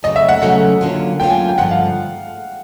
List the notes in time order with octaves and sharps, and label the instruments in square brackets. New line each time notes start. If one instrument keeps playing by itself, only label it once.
[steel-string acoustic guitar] C#3 F#3 A3 C#4 [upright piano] D#5
[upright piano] E5
F#5
[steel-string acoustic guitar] C#3 F#3 A3 C#4 [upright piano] F#5
[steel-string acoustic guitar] D3 F#3 A#3 C#4 F4
[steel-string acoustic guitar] D3 F#3 A#3 C#4 F4 [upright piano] G5
[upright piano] G#5
G5
[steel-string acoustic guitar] G2 D3 F3 A3 [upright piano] F#5
[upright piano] F5